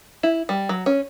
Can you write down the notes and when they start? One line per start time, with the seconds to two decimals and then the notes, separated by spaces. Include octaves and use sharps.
0.23 E4
0.49 G3
0.69 F#3
0.86 C#4